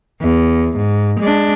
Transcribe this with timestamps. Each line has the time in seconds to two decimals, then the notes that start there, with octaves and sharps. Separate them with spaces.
0.22 E2
0.77 G#2
1.20 G#3 D4